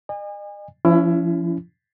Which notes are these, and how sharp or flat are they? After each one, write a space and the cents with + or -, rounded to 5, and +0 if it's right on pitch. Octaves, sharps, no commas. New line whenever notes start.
D#5 -40 G#5 -35
F3 -25 C#4 +25 E4 +25